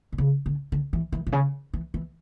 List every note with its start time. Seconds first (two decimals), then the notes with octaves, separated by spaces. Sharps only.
0.12 D3
0.18 C#3
0.46 D3
0.72 D3
0.93 E3
1.12 E3
1.27 A#2
1.32 C#3
1.74 E3
1.94 E3